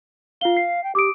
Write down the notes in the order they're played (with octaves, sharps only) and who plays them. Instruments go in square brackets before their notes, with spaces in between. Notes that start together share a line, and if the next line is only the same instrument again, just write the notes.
[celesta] F4 G7 [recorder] F5
[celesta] C7
[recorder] G5
[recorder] G4 [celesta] D6 D#6 D7